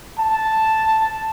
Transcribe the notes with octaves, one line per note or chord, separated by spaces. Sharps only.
A5